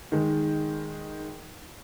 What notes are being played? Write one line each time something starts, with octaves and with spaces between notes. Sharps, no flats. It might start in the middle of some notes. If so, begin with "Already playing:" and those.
D#3 G#3